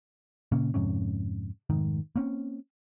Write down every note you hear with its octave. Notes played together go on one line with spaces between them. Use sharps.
A#2 C#3 A#3 C#4
F2 G#2 C3 C#4
F1 G#2 D#3
A#3 C4 C#4